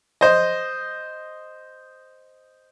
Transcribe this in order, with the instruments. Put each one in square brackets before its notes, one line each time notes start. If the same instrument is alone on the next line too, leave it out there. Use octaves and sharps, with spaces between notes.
[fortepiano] C5 D#5